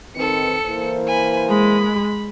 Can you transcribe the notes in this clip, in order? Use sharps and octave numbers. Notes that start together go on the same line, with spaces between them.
D#3 C4 A4 B4 C#7
E3 A#3 C5
G#5 B5
G#3 B5